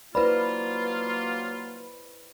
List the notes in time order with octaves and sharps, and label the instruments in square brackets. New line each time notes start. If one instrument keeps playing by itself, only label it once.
[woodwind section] F#3 A#3 F4 [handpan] E4 C5 D5 [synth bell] B4 B5